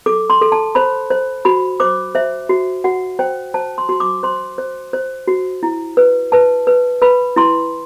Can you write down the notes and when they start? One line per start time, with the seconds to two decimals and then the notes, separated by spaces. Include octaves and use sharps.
0.06 A4 D6
0.30 C6
0.41 A4
0.52 A5
0.75 C5 B5
1.10 C5
1.45 F#4 B5
1.80 C5 D6
2.15 C5 E5
2.49 F#4
2.84 F#4 F#5
3.19 C5 G5
3.54 C5 A5
3.78 C6
3.89 F#4 C6
4.00 D6
4.23 C5 C6
4.58 C5
4.93 C5
5.27 F#4
5.63 E4
5.97 B4
6.32 B4 A5
6.67 B4
7.02 B4 B5
7.36 E4 C6